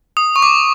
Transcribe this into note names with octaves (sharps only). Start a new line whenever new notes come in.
D#6
C#6
D6